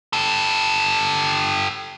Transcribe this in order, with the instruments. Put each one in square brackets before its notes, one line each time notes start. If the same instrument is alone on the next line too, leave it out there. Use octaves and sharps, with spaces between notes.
[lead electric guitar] G4 A4